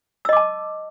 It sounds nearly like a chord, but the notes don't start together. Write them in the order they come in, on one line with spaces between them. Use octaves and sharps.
E6 D#5 D6 A5